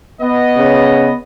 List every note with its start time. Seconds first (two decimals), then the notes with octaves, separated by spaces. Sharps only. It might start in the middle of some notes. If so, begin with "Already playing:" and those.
0.21 B3 D#5
0.57 C#3